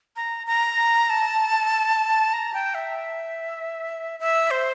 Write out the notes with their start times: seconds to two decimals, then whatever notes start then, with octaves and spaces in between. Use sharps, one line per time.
0.16 A#5
0.47 A#5
1.10 A5
2.33 A#5
2.54 G5
2.75 E5
4.20 E5
4.51 C5